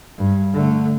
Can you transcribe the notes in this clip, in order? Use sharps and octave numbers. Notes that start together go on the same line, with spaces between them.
G2
D3 A3